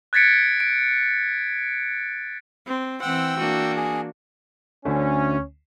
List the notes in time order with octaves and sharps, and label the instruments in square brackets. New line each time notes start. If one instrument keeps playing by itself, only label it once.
[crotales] F#6 G#6 A6 B6 C#7 D7
D7
[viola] C4
[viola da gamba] E3 C4 [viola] F#5 [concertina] G5 E6
[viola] A#3 D4 [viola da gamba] F#4
[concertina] G#4
[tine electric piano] D2 D3 A3 [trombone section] C#4